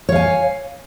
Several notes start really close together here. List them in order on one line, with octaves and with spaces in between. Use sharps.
C#5 F5 G#5